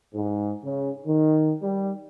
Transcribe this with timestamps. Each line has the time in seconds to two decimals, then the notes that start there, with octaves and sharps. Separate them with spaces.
0.14 G#2
0.63 C#3
1.07 D#3
1.62 G3